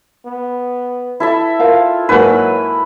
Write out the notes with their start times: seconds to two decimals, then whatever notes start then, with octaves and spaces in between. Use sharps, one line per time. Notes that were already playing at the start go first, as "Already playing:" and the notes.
0.26 B3
1.20 E4 A4 E5
1.60 F4 A#4 C5 F5
2.09 G#2 F#3 A#3 F#4 B4